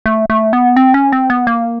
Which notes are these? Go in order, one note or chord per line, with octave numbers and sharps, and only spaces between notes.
A3
A3
B3
C4
C#4
C4
B3
A#3